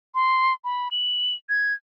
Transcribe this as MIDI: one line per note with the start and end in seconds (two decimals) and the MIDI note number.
0.15 0.53 84
0.64 0.89 83
0.91 1.34 102
1.49 1.73 92